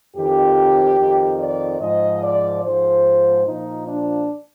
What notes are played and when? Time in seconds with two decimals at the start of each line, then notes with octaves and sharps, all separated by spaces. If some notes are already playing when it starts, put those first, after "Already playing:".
0.16 F2 D#3 G4
0.99 F2 D#3
1.39 D5
1.81 G#2 F3 D#5
2.22 D5
2.62 G#2 F3 C5
3.45 A#2 F3 D#4
3.86 D4